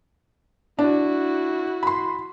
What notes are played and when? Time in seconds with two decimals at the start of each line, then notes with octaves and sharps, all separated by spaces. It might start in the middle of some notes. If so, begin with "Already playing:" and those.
0.79 D4 E4 F#4
1.83 B5 C6